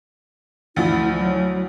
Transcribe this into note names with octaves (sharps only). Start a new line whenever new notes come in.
D2 F3 E4
F#3